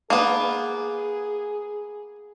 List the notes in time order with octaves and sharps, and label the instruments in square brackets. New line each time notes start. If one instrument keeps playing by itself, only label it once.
[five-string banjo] A#3 B3 [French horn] G#4